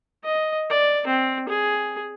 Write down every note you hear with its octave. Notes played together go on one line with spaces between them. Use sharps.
D#5
D5
C4
G#4